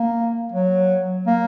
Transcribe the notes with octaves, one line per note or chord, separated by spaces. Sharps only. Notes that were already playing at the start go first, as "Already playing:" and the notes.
Already playing: A#3
F#3
A#3